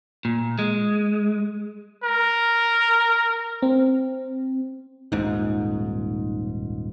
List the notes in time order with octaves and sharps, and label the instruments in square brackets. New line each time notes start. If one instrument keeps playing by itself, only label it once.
[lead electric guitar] A#2
G#3
[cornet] A#4
[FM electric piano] C4
[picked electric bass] D#1 G#2 [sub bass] B1 [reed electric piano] D#4